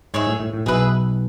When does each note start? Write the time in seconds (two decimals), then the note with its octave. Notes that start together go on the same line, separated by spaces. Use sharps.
0.14 G#2 G#4 C#5 E5
0.27 A2
0.40 A2
0.54 A2
0.66 B1 B2 G#4 B4 E5